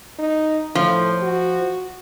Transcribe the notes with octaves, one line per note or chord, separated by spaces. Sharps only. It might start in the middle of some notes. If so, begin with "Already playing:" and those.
D#4
A2 F3
F#4